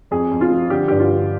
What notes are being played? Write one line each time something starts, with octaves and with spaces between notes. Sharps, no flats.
F2 G#4
F2
F4
F3
D3 G4
G2 G4
F4
D3